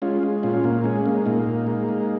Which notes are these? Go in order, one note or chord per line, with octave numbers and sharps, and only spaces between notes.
G#3 C#4 F4
G#3
A#2 C#4 F4
A#2 A#3
G#3 C#4
G#3 A#3
A#2 A#3 D#4
A#2
G#3
G#3